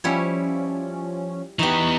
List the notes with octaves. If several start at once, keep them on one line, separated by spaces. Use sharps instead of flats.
F3 G3 C#4 E4 C#5
E3 B3 D#4 G4 C#6